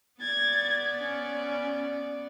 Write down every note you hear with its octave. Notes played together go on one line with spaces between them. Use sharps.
B3 D5 G#6 A6
C#4